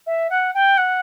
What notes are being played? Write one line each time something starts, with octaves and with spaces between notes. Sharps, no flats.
E5
F#5
G5
F#5